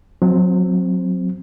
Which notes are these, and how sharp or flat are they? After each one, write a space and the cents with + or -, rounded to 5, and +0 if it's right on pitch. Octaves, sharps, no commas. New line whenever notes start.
F#3 -25 C4 +0